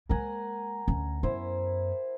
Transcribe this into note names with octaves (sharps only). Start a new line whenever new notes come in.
G#3 A#3 A#4 F#5 G#5
D2 C#4
F#2 B3 E4 C5